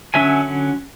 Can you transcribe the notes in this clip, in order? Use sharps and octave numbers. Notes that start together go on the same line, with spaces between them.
D3 F#3 C#4 E5 G#5